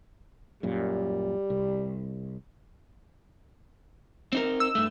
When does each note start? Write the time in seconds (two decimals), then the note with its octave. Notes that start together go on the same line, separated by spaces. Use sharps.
0.63 F#2 A#2 G3
1.50 C2
4.33 C4 D#4 A#4
4.60 E6
4.75 G2 A3